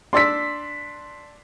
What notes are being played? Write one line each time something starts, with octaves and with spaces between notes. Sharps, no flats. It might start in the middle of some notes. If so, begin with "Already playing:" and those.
D4 D5 C6 E6 B6